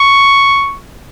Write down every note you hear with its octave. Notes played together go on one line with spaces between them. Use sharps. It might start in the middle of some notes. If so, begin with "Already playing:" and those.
Already playing: C#6